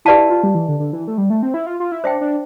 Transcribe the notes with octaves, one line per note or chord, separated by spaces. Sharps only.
E4 G4 B4 D5 F5 A5
E4
F4
G3
E3
D3
D3
E3
A3
G3
A3
C4
E4
F4
F4
E4
D4 C5 E5 G5
D4